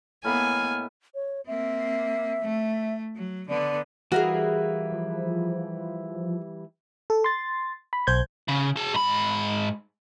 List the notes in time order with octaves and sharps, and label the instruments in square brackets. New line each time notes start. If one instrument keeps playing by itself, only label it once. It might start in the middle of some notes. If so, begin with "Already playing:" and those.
[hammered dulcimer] A2 D#5 B5 [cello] A#3 B3 [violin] G#5 [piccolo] F6
[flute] C#5
[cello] A#3 C4 [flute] E5
[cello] A3
F#3
[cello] D3 B3 [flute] D5
[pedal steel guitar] E3 G3 E4 [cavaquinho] F#4 [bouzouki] G#4 A#4 F5
[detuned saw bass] F3
[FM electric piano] A4
C6 A6
B5
B1 C5 G6 G#6
[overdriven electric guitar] C#3
G#4 A5
G#2 B5